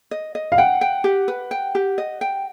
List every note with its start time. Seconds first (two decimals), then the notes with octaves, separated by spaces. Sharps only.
0.11 D#5
0.35 D#5
0.52 F5
0.58 F#5 G5
0.81 G5
1.04 G4
1.28 B4
1.51 G5
1.75 G4
1.98 D#5
2.21 G5